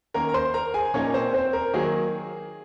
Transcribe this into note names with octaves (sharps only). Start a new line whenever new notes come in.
D#3 A#3 C#4 A#4 A#5
A#5
C5 C6
A#4 A#5
G#4 G#5
A#2 F3 A#3 C#4 D#4 C#5
C4 C5
C4 C5
A#4
D#3 F#3 A#3 G#4